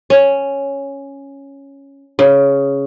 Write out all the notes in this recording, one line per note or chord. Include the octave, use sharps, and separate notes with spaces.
C#4
C#3